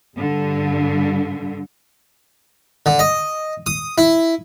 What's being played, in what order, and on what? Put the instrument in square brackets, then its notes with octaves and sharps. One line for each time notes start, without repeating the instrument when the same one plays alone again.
[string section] G2 D3
[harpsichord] D3
D#5
D#6
E4